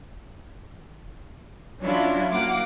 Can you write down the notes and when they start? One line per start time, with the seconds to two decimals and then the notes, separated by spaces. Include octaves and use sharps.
1.81 F#3 C#4 D4 E4 F4
2.31 F#3 A#3 F5 F#5 D6